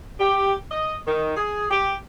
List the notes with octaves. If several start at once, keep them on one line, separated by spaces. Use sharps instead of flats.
G4
D#5
D#3
G#4
G4